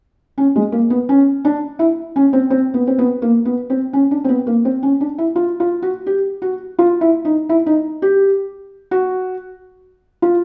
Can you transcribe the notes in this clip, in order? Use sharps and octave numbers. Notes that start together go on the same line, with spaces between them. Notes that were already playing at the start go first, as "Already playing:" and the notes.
C#4
G#3
A#3
B3
C#4
D4
E4
C#4
C4
C4
B3
C4
B3
A#3
B3
C4
C#4
D4
C4
B3
A#3
C4
C#4
D4
E4
F4
F4
F#4
G4
F#4
F4
E4
D#4
E4
D#4
G4
F#4
F4